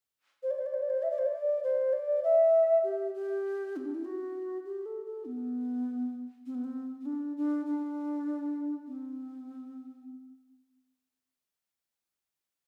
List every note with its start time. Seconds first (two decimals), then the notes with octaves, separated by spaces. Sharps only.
0.42 C5
0.50 D5
0.58 C5
0.66 D5
0.73 C5
0.82 D5
0.90 C5
1.02 E5
1.10 D5
1.18 C5
1.25 D5
1.63 C5
1.92 D5
2.23 E5
2.83 G4
3.14 G4
3.76 C4
3.85 D4
3.94 E4
4.04 F#4
4.65 G4
4.85 A4
5.05 A4
5.25 B3
6.46 C4
6.54 B3
6.64 C4
7.00 C4
7.05 D4
7.37 D4
7.66 D4
8.87 C4